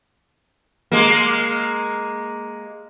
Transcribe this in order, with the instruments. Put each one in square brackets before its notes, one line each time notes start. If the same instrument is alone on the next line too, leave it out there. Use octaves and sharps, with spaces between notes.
[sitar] G#3 A#3